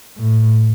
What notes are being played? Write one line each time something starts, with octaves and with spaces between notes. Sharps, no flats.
A2